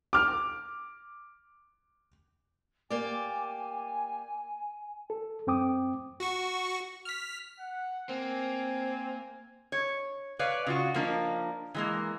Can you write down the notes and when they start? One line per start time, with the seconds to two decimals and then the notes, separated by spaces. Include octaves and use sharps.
0.13 D6 F6
2.90 A#3 G4 D5 G#5
5.10 A4
5.47 F#2 C4 G5 D6 D#6
6.20 F#4 C#6
7.05 F6 B6
7.60 F#5
8.09 A#3 C4 G#5
9.72 C#5
10.39 B4 C#5 D5 F5
10.67 C#3 F4 F#4
10.94 F3 A#3 D4 D#4
11.74 E3 G#3 A#3